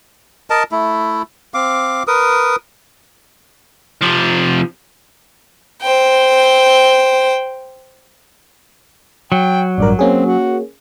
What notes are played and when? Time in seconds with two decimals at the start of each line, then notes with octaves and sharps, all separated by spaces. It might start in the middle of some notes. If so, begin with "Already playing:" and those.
0.50 A#4 D#5 A5
0.72 A3 E4
1.54 C4 F5 D6
2.07 A#4 B4 D#6
4.02 C3 F3
5.82 C5 G5
9.32 F#3 G5
9.78 A1 G2 A#4 D5
9.99 A#3 C4 C#4 G#4
10.26 F#4